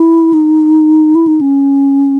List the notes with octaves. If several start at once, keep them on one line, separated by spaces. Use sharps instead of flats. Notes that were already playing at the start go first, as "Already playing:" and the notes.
Already playing: E4
D#4
E4
D#4
C#4